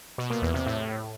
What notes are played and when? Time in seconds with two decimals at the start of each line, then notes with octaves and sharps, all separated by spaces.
0.18 B2
0.30 A#2
0.42 E2
0.54 C3
0.66 A2